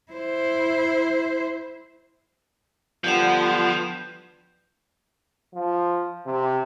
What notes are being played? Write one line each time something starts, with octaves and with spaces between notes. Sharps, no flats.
E4 C5
D3 F3 G3 B3 G6 G#6 E7
F3
C3